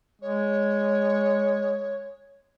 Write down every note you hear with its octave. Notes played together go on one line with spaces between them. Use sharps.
G#3 C#5